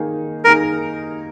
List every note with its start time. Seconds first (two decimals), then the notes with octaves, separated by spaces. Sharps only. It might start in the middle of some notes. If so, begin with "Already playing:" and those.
Already playing: D#3 A#3 D#4 G#4
0.45 D#3 A#3 D#4 G#4 A#4